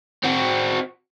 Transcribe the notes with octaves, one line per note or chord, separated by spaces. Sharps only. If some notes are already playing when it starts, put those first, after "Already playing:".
C4 F#4